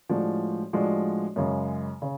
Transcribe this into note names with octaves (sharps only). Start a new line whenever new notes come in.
A2 F3 G#3 D4 F#4
A2 F3 G#3 D4 F#4
F#2 C#3 G#3
C#3